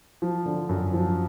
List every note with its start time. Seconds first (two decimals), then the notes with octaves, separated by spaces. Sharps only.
0.22 F3
0.46 D3
0.69 F#2
0.93 F3